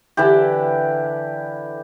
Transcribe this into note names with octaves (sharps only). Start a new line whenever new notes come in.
D3 E3 E4 G4